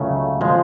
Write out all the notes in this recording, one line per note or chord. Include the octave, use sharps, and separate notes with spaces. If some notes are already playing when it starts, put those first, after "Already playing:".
Already playing: C#2 C#3 F#3 A3 C#4
F3 G#3